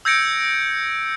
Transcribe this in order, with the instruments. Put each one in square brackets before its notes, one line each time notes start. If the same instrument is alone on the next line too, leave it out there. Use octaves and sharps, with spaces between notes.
[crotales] E6 G6 G#6 A#6 C#7 D7